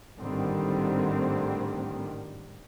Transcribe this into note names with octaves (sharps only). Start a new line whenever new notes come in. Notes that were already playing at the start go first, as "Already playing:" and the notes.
G#1 A2 D3 D#3 G3 C4